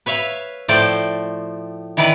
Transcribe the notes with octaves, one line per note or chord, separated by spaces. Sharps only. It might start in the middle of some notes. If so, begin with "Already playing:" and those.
B4 C#5 E5 F5
A2 F3 A3 C5 D5 G5
D#3 E3 E4 B4 D5